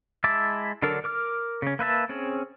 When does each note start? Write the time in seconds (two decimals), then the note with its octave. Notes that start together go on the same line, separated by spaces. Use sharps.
0.24 G#3 E4 E5 A5 D6
0.82 D3 F#3 D4 A4 A#4
1.04 A#4 D6 F6
1.62 C#3 C#4
1.79 A#3 B4 E5 A5
2.09 C4 C#4 G#4